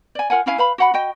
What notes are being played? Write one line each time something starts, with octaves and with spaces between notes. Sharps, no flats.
D5 G#5
F4 A#4 F#5 G#5
C#4 E4 F5 G#5
B4 F5 B5
F#4 F#5 B5
F#4 D#5 G5